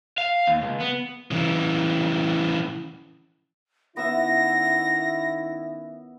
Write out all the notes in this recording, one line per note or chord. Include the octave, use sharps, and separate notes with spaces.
F5
D#2
C#2
B3
C#3 E3
D#3 B3 C#4 E4 E5 A#6